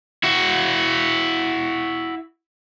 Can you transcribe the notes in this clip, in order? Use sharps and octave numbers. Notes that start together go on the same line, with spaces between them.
E4 F#4